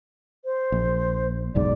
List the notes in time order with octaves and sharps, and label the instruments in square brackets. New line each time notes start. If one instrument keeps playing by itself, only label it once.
[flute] C5
[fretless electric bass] A#1
[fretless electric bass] F#1 B1 G#2 [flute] D5